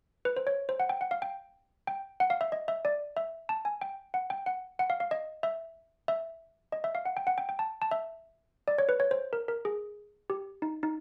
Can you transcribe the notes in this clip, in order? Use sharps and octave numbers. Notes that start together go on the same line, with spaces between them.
B4
C5
C#5
C5
F#5
G5
F#5
F5
G5
G5
F#5
F5
E5
D#5
E5
D5
E5
A5
G#5
G5
F#5
G5
F#5
F#5
F5
F5
D#5
E5
E5
D#5
E5
F5
F#5
G5
F#5
G5
G5
A5
A5
E5
D5
C#5
B4
C#5
C5
A#4
A#4
G#4
G4
D#4
D#4